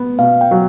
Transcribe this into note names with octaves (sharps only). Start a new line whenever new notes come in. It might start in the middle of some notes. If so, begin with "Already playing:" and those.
Already playing: B3
B2 F5
G5
F#3